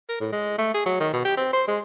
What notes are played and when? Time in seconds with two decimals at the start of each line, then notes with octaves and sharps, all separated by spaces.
0.09 A#4
0.21 A2
0.32 G#3
0.58 A3
0.74 G#4
0.86 F#3
1.00 D#3
1.13 B2
1.25 G4
1.37 C4
1.53 C5
1.68 G#3